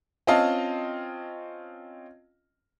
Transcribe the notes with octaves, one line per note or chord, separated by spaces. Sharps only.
C4 C#4 F4 D#5 F5 A5